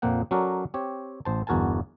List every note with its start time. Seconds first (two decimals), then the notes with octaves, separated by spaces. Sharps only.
0.02 F2 A#2 F3 A#3 F#5 G5
0.31 F#3 C#4 F#4 A4 A#4 D5
0.74 C4 G4 C#5
1.25 A1 C5 A5
1.47 G1 E2 F#4 A#4 G#5 A5